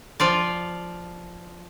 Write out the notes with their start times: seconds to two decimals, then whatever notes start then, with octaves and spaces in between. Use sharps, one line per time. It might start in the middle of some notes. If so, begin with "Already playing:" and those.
0.20 F3 F4 D5